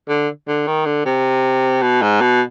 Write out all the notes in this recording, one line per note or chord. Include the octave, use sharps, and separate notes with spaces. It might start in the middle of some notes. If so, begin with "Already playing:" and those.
D3
D3
D#3
D3
C3
B2
G#2
B2